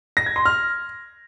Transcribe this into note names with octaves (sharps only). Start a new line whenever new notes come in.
A#6
G#6
C6
F6